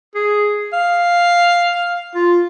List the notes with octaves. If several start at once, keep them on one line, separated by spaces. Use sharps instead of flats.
G#4
F5
F4